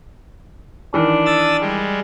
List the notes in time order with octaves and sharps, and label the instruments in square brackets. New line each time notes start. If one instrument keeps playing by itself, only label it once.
[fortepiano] D#3 E3 [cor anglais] D4
[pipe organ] D#6 E6 A6
G3 G#3